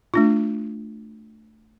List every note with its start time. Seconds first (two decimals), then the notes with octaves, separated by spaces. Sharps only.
0.14 A3 D4 F4